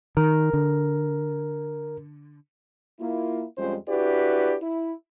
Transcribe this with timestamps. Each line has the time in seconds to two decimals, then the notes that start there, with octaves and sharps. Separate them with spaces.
0.17 D#3 A#4
0.53 D3
3.00 A#3 E4 F4
3.57 F2 G3 G#3 C#4 F4 C5
3.88 D4 E4 F#4 G4 B4 D5
4.62 E4